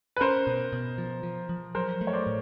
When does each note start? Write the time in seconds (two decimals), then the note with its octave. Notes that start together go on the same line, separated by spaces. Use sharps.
0.16 B4
0.20 C#4 A#4 C5
0.47 B2
0.73 B2
0.98 F3
1.23 F3
1.49 F3
1.75 F#3 A#4 C5
2.01 A3
2.07 C#5
2.13 C5 D5
2.26 A2